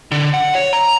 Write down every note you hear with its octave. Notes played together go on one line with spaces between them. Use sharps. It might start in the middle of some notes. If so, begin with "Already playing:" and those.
D3
F#5
C#5
A#5